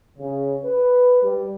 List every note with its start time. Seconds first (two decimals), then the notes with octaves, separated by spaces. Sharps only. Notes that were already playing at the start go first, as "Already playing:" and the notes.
0.19 C#3
0.65 B4
1.23 G3